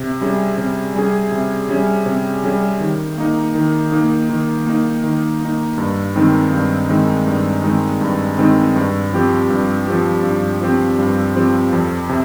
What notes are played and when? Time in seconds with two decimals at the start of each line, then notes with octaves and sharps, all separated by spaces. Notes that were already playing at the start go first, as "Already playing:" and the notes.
Already playing: C3
0.21 G3 C#4 G#4
0.58 C3
0.95 G3 C#4 G#4
1.32 C3
1.69 G3 C#4 G#4
2.06 C3
2.44 G3 C#4 G#4
2.80 D#3
3.18 A#3 D#4
3.55 D#3
3.92 A#3 D#4
4.30 D#3
4.67 A#3 D#4
5.04 D#3
5.41 A#3 D#4
5.78 G2
6.15 D#3 G#3 C4 D#4
6.53 G2
6.89 D#3 G#3 C4 D#4
7.27 G2
7.64 D#3 G#3 C4 D#4
8.01 G2
8.38 D#3 G#3 C4 D#4
8.76 G2
9.13 F3 C4 G4
9.50 G2
9.87 F3 C4 G4
10.24 G2
10.61 F3 C4 G4
10.98 G2
11.35 F3 C4 G4
11.73 F2
12.09 C3